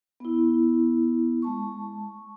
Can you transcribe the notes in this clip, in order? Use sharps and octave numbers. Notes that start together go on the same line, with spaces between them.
B3 E4
G#3 A5 C#6